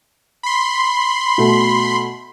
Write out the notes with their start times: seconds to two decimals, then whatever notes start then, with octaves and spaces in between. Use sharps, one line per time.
0.43 B5 C6
1.38 B2 A3